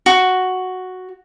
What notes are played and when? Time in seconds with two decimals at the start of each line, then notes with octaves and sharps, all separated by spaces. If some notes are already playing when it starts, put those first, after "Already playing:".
0.06 F#4